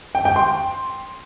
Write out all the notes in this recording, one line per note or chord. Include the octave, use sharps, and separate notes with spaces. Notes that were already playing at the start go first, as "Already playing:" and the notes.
G5
G5
C6